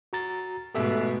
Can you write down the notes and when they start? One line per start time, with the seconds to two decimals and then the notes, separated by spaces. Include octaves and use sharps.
0.13 F#4 A#5 A6
0.75 G#2 B2 A3 G4 A4 E5